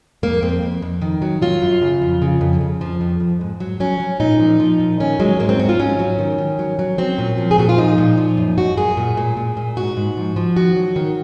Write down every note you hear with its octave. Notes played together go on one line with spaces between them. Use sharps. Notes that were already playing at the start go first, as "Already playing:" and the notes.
F2 A#3
F2 C4
F2
F2
D#3
F#3
F#3 F4
F#2
C#3
F2
C#3
F2
F2
F3
F2
F2
G#2
F#3
F#3 C#4
F#3
A#2 D#4
F3
F3
A#2
D#3 C#4
F#3 G#3
G#2 A#3
C4
G#2 F#4
F4
F#3 C#4
F#3
D#3
D#3
F#3
F#3
F#3 C4
A#2
F3
G#4
A#2 F#4
F4
F3 D#4
A#2
F3
F#2
F#2 F#4
F#2 G#4
A#2
A#2
A#2
A#2
G#2 F#4
G#2
F3
F3
D#3 F#4
F#3
D#3